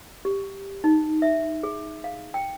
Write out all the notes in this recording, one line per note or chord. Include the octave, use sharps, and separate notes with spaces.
G4
D#4
E5
G#4
F5
G5